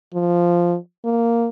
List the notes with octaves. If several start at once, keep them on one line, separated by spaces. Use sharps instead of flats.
F3
A#3